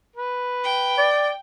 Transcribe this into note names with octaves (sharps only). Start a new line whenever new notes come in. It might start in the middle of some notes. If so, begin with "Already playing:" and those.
B4
G5
D5